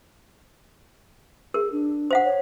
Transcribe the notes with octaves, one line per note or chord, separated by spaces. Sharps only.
G#4 A#4
D4
C5 F5 F#5
C#5